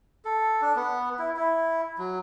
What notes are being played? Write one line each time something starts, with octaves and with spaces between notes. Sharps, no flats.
A4
D4
B3
E4
E4
F#3